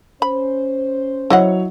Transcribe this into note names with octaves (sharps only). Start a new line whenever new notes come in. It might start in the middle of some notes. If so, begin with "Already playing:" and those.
C#4 C5 B5
F#3 E4 C#5 D#5 F#5